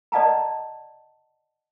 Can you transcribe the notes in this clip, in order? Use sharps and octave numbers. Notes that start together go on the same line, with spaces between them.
D5 D#5 F#5 A5 A#5